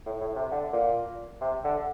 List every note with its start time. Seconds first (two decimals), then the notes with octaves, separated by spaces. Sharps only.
0.06 A2
0.21 A2
0.36 C3
0.51 D3
0.73 A#2
1.41 C3
1.64 D3